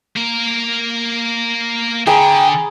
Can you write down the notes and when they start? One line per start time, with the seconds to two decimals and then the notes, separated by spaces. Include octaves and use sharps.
0.16 A#3 A#4
2.07 D3 G#4 G5 A#5 B5